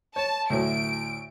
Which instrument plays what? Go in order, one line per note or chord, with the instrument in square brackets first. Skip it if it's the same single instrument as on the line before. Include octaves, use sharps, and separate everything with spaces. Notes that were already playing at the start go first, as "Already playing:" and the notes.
[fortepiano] C#5 [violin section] A5
[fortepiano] D2 A2 F#3 [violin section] D7